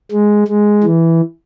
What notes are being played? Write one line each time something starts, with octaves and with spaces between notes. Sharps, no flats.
G#3
G#3
E3